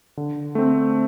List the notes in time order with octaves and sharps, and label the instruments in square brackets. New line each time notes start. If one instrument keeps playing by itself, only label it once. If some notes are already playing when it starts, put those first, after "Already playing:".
[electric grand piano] D3
A3 C4